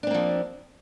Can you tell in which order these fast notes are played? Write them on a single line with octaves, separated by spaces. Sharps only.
D4 C4 A#3 F3